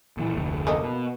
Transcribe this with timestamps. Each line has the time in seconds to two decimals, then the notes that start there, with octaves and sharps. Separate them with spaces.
0.17 A#2 E3
0.34 F1 D2
0.67 A#3 A4 D#5
0.83 B2